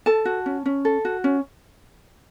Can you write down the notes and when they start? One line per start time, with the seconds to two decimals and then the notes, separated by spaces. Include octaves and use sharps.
0.06 A4 A5
0.25 F#4
0.46 C#4
0.66 C#4
0.85 A4
1.05 F#4
1.24 C#4